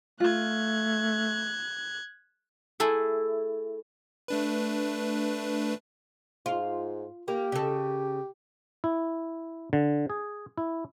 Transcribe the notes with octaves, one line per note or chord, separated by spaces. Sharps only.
A3 F4 F#6 G#6
A3 E4 G#4 A4
A3 D4 B4
G#2 F4
A#3 G4
C#3 A4
E4
D3
G#4
E4